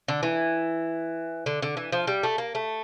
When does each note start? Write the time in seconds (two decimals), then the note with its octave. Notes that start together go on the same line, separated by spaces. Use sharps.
0.08 D3
0.23 E3
1.46 D3
1.62 D3
1.77 E3
1.92 F3
2.07 G3
2.23 A3
2.38 A#3
2.55 A3